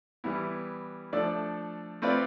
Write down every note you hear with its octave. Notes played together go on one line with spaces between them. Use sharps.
E3 G3 B3 E4
F3 A3 D4 A4 D5
A3 C4 F4 B4 D5